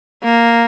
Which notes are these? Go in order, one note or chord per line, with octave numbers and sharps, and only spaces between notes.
A#3